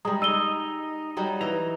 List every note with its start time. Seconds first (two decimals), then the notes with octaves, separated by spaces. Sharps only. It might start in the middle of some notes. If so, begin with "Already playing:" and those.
0.05 G3 G#3 A#5 D#6
0.22 D#4 D#5 E6 D#7 G7
1.17 F#3 G3 D#4
1.41 E3 D#5 A#5